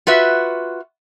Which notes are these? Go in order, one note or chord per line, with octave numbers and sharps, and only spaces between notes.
F4 F#4 B4 E5